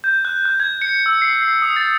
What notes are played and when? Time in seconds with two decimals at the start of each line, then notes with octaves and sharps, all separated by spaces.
0.04 G6
0.25 F#6
0.45 F#6
0.60 G#6
0.82 C#7
1.06 E6
1.22 C7
1.42 C7
1.62 D#6
1.76 A6